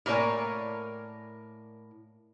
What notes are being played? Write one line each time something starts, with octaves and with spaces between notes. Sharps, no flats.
A2 A#3 A#4 C#5 D5 G#5